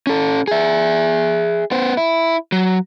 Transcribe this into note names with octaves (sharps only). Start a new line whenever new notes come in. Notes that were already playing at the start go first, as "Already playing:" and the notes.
C#4 A4
G#4 E5
B3 C5
E4
F#3